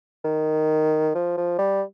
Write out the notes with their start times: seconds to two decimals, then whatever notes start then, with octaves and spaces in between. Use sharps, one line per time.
0.24 D#3
1.15 F3
1.37 F3
1.59 G3